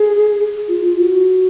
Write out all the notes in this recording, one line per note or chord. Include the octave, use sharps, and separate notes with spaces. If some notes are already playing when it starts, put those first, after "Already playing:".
Already playing: G#4
F4
F4
F#4